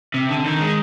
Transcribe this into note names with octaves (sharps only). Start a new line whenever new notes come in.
C3
D3
D#3
G#3